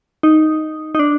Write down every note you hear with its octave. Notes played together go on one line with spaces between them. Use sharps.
D#4
D#4
D4